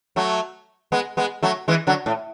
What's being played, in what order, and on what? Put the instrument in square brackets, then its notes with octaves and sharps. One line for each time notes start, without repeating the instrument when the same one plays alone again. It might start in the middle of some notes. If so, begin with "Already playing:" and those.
[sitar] F#3 A3
G#3 B3
G#3 B3
F#3 A3
E3 G#3
D3 F#3
A2